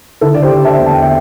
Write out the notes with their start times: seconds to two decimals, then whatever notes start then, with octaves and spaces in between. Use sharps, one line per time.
0.21 D3 E4 A4
0.34 D5
0.43 G4 C5
0.51 D3
0.64 E5 A5
0.79 E2
0.86 A5
0.93 G5
1.01 E5